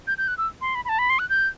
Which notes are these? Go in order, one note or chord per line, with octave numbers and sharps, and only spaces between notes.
G6
G6
F#6
E6
C6
B5
B5
A5
B5
C6
F#6
G6